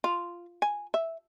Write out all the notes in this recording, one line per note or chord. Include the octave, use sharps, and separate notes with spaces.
F4
G#5
E5